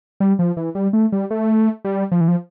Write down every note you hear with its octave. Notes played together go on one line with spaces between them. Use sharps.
G3
F3
E3
G3
A3
G3
A3
G3
F3
E3
F3